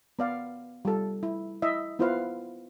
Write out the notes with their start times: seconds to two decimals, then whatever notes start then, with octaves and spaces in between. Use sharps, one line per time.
0.19 B3 D5 F5
0.85 G3 F4 A4
1.23 E4
1.62 E4 D#5 E5
1.99 B3 E4 F4 B4 C5 F5